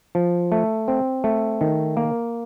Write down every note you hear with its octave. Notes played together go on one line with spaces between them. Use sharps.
F3
A3
C4
A3
D#3
A#3